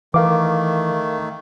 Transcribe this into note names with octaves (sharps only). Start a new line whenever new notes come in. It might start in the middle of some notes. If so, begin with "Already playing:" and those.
D#3 E3 A3 A#4 F5 D6